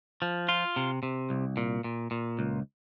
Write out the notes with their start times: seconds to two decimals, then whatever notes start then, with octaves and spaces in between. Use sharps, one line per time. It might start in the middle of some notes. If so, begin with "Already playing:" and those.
0.22 F3
0.49 F4
0.76 C3
1.03 C3
1.30 C2
1.57 A#2
1.84 A#2
2.11 A#2
2.39 C#2